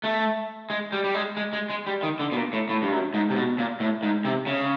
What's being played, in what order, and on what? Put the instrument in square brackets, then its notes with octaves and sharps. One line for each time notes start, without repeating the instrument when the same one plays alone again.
[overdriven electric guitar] A3
G#3
G3
G3
G#3
G#3
G#3
G#3
G3
D#3
D3
B2
A#2
A2
A2
G2
F#2
G#2
C3
B2
A#2
A2
G#2
C3
C#3